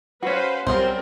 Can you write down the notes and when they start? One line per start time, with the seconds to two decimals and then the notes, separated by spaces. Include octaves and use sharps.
0.23 C#4 F#4 B4 C5 F5
0.67 B1 G3 C4 F4 G#4 A#4 C5